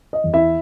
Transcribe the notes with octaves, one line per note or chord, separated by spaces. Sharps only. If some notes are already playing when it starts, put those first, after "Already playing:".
D#5
E2
E4 E5